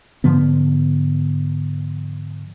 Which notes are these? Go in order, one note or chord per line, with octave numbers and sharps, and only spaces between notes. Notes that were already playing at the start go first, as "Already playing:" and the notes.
G#2 D3 F3 B3